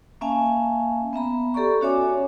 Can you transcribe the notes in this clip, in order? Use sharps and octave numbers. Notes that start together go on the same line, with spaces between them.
A#3 C#4 E5 F5 G#5 A5
B3 E5 A#5 B5
G4 A4 D5 A#5 C#6
C#4 F#4 C#5 E5 G#5 D6